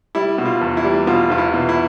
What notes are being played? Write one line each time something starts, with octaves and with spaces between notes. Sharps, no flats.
G3 E4
B2
F4
E2
E4
G3
B2 F4
E2 F4
E4
B2
E4